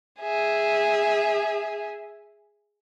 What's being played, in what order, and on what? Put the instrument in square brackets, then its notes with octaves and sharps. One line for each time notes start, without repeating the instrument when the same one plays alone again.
[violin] G#4 E5